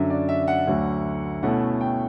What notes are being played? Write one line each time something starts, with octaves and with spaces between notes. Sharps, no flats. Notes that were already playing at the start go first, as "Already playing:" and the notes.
Already playing: F#2 D3 F#3 E5
D5
E5
E5
F#5
D2 D3 F#3
B2 A3 C#4 E4 F#5
G5